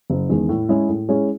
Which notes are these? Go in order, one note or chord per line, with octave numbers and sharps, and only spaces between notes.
F#1
E2 D#3 G#3
A2
G#3 C#4 E4 G#4
A2
G#3 C#4 E4 G#4